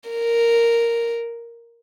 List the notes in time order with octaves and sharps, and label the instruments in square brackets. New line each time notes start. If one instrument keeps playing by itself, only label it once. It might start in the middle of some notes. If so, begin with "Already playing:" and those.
[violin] A#4